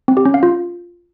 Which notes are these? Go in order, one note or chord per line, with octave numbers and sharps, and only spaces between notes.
C4
G4
C#4
F5
F4